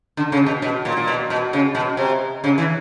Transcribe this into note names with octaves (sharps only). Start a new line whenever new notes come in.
D3
C#3
B2
B2
A#2
A#2
B2
B2
C#3
B2
C3
C#3
E3